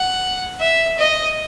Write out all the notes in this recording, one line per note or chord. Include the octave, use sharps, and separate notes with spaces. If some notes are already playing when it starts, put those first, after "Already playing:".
Already playing: F#5
E5
D#5